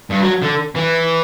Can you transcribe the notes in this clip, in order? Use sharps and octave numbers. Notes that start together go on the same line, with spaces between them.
G2
F#3
D3
E3